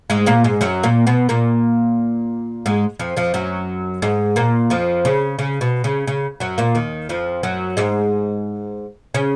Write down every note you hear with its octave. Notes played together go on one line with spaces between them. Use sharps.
G#2 G#3
A#2 A#3
G#2 G#3
F#2 F#3
A#2 A#3
B2 B3
A#2 A#3
G#2 G#3
F2 F3
F2 F3
F#2 F#3
G#2 G#3
A#2 A#3
F2 F3
C#3
C#3
B2
C#3
C#3
F#2 F#3
A#2 A#3
D#2 D#3
F2 F3
F#2 F#3
G#2 G#3
C#3 C#4